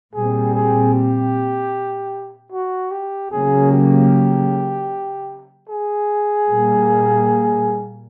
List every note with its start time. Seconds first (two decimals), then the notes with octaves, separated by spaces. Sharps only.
0.14 A#2 G3 C4 G#4
0.54 G#4
0.94 G4
2.53 F#4
2.91 G4
3.31 C#3 F#3 A#3 C#4 G#4
3.71 G4
5.69 G#4
6.48 A#2 G3 A#3